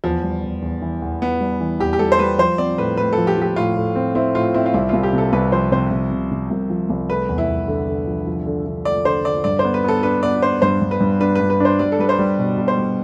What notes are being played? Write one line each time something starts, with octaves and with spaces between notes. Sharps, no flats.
E2 F3
G3
E2
E2
E3
E2
E3 B3
G3
E3
E2 G4
G4
G3 A4
C5
G3 B4
F3 C5
C4 D5
A2 B4
A2 B4
A4
F3
G4
F3 G4
A2 F4
A2
C4
C4 E4
A2 F4
C4 E4
F4
C2 E4
C2 F4
G4
C3 A4
C2 B4
F3 C5
C3 C5
C3
C3
C3
C2
F3
C2
A3 B4
E2
E4
E2
D3
D3
F3
F3
D3
D3
A3 D5
D3 C5
D3 D5
G2 D5
C5
B3
B4
B3 A4
D4 B4
B3 D5
D4 C5
G2 C5
G2
B4
G2
D4 B4
B4
G2
B4
D4 C5
G3 D5
A4
G3 B4
C5
G3
B2
B2
C5
G3